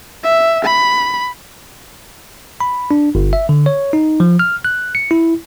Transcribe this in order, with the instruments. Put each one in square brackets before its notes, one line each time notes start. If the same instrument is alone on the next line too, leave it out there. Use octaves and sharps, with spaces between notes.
[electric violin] E5
B5
[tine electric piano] B5
D4
G1
E5
D3
C#5
D#4
F3
F6
F#6
C#7
E4